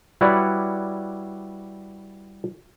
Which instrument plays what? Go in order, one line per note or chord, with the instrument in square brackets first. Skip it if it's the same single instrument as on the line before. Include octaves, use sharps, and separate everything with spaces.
[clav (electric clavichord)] G3 E4 F#4 B4 C#5 D5